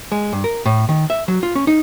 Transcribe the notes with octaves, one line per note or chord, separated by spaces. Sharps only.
G#3
G2
A#4
A2
D#3
E5
F#3
F4
C#4
D#4